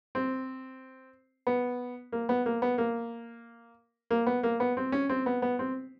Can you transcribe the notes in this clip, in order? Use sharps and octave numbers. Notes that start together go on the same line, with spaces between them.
C4
B3
A#3
B3
A#3
B3
A#3
A#3
B3
A#3
B3
C4
C#4
C4
B3
B3
C4